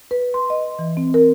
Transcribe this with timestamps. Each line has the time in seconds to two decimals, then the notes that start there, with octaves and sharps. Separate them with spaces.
0.11 B4
0.34 C6
0.50 D#5
0.79 E3
0.97 C4
1.14 A#4